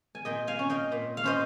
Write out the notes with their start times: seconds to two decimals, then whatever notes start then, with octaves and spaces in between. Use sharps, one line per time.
0.15 G#5
0.25 A#2 D#5 G5
0.47 F5 G#5
0.59 C#4
0.70 D#5 G5
0.92 A#2
1.17 F5
1.24 C#4 C5 D#5